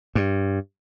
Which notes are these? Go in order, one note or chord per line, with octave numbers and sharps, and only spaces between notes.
G2